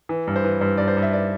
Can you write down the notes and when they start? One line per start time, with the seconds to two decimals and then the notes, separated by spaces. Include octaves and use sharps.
0.09 E3
0.27 G2
0.36 C5
0.44 E3
0.61 G2 C5
0.78 G2 D5
0.88 C5
0.97 G2
1.02 E5
1.13 D5